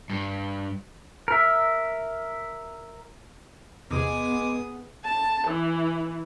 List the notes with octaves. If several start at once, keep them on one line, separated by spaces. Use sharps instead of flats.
G2
A#4 E5
E2 C3 G#3 B3 G#4 D6 D#6
A5
E3